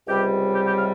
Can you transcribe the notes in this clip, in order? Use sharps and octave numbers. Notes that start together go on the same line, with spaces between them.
C#2 C3 G3 G4
G4
G4
F5